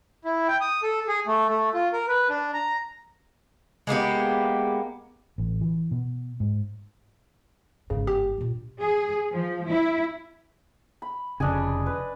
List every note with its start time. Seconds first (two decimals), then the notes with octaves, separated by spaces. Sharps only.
0.25 E4
0.48 G5
0.61 D#6
0.83 A4
1.08 G#4
1.27 A3
1.49 A3
1.74 F4
1.93 A#4
2.08 B4
2.29 D4
2.54 A#5
3.87 G#3 A#3 B3 G4
5.38 A1
5.61 E3
5.91 B2
6.40 G#2
7.90 G1 G#2 C#3
8.07 G4
8.38 A#2 D4
8.81 G#4
9.33 F3
9.68 E4
11.02 B5
11.40 F1 C#3 D4 D#5 G#5
11.86 B4